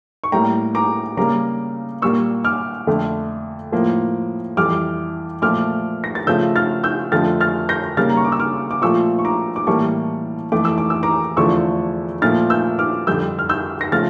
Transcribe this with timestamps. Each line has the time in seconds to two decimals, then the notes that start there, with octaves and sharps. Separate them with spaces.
0.24 C#6
0.32 A2 G3 A#3 G5 A#5
0.75 A#5 D6
1.17 C#3 G3 A#3 A#5 D6
2.02 A#2 G3 A#3 C#6 E6
2.45 D6 F6
2.87 F2 D3 A3
3.72 A2 F3 A#3
4.57 F2 E3 G3 D6 F6
5.42 A#2 F3 A3 D6 F6
6.04 A#6
6.15 A6
6.27 C#3 F3 A3 E6 G6
6.56 F6 A6
6.84 E6 G6
7.12 F2 D3 F3 A3 F6 A6
7.41 F6 A6
7.69 G6 A#6
7.97 C#3 G3 A#3 F6 A6
8.10 A#5
8.17 C#6
8.25 D6
8.32 E6
8.40 D6 F6
8.71 D6
8.82 A#2 F3 A3 C#6 E6
9.19 C#6
9.25 A#5 D6
9.56 D6
9.67 A2 E3 G3 A#3 A5 C#6
10.52 F2 E3 A3 D6
10.65 E6
10.78 D6
10.90 E6
11.03 A#5 D6
11.37 E2 D3 F3 A3 C#6 E6
12.22 A#2 F3 A3 F6 A6
12.50 E6 G6
12.79 D6 F6
13.07 F2 D3 G3 E6 G6
13.39 F6
13.49 E6 G6
13.81 A#6
13.92 C#3 F3 A3 F6 A6